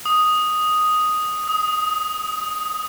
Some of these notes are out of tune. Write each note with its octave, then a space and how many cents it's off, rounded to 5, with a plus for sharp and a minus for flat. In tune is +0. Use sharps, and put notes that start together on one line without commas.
D#6 +0
D#6 +30